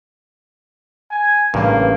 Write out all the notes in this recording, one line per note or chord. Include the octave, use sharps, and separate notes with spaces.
G#5
A1 G2 A#3